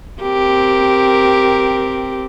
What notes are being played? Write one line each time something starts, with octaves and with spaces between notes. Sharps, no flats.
C4 G4 A#4